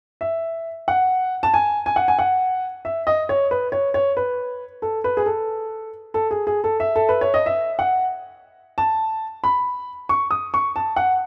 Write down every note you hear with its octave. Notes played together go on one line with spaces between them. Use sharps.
E5
F#5
A5
G#5
G#5
F#5
G#5
F#5
E5
D#5
C#5
B4
C#5
C#5
B4
A4
B4
G#4
A4
A4
G#4
G#4
A4
E5
A4
B4
C#5
D#5
E5
F#5
A5
B5
C#6
D#6
C#6
A5
F#5